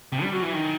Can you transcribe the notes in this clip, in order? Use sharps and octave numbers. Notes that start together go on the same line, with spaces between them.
C3
G3
F#3
E3
D#3